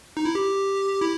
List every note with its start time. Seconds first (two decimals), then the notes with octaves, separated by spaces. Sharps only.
0.17 D#4
0.25 E4
0.35 G4
1.01 E4